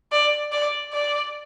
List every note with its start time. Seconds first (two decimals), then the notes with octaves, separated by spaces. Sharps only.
0.12 D5
0.52 D5
0.93 D5